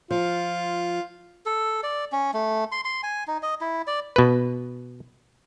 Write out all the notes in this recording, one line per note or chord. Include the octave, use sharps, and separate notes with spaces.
F3 F4
A4
D5
C#4
A3
C6
C6
G#5
D#4
D#5
E4
D5
B2 B4